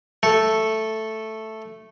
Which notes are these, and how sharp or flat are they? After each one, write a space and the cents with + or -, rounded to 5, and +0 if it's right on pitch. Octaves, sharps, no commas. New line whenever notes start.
A3 +0 A4 +0